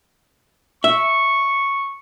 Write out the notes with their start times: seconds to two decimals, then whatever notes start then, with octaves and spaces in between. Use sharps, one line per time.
0.84 E5 C#6